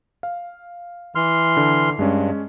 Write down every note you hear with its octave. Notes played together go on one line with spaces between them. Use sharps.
F5
E3 C6 F6
D3
G2 G#3 C#4